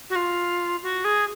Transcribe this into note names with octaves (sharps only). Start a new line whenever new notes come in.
F#4
F4
F#4
G#4